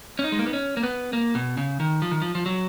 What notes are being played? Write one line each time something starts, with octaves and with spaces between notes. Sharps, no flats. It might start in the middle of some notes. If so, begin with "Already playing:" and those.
C#4
D#4
G#3
A#3
B3
C#4
A#3
B3
A#3
B2
C#3
D#3
F3
D#3
F3
F3
F#3